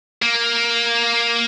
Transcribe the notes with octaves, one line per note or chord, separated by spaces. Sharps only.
A#3